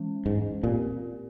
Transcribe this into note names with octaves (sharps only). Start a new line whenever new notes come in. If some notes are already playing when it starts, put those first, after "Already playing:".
Already playing: E3 G#3 C#4
G#2
A#2 C4 G4 A#4